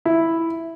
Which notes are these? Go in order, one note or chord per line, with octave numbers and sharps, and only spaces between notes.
E4